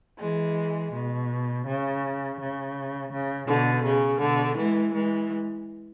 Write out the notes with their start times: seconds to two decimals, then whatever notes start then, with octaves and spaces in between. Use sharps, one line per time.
0.19 E3 G#3
0.92 B2
1.65 C#3
2.38 C#3
3.11 C#3
3.48 B2 D3
3.84 C#3
4.21 B2 D3
4.57 E3 G#3
4.94 E3 G#3